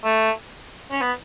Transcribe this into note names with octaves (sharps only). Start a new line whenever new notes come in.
A3
C#4
B3